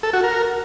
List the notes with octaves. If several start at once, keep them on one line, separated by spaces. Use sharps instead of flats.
A4
F#4
A#4